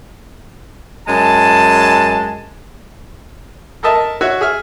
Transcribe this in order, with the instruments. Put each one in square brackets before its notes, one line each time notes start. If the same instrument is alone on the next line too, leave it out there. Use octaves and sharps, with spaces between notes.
[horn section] F#2 G#3 A5
[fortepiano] A4 A#4 D#5 E5 A5
F#4 C#5 E5
G#4 E5 F6